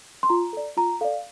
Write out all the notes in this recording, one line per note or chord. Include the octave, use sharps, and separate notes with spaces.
C6
F4 A#5
A4 D5
F4 A#5
A4 D5 F5